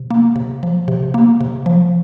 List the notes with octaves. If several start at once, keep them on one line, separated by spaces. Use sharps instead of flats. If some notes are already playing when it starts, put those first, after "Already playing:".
Already playing: C3
A#3
C3
F3
C3
A#3
C3
F3